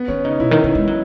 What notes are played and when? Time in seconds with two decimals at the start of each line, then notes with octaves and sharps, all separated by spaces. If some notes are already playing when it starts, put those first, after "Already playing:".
Already playing: B3
0.08 D#3 C#4
0.24 C#3 D#4
0.40 B2 E4
0.51 D#3
0.64 D#3
0.75 G#3
0.87 F#3